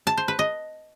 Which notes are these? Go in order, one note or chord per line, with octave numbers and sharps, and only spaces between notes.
A5
C5
B4
D#5